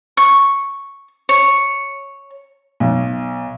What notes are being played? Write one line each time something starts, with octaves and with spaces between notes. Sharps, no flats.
C#6
C#5
B1